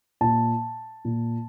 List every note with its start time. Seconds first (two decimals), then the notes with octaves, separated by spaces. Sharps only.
0.21 A#2 A5
1.05 A#2